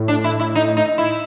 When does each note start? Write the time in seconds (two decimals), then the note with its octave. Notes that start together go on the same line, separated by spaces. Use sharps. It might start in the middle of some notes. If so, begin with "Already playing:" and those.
Already playing: A2
0.08 D4
0.24 E4
0.40 E4
0.55 D#4
0.77 D#4
0.98 E4